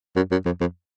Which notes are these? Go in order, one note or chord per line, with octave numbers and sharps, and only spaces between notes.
F#2
F#2
F2
F2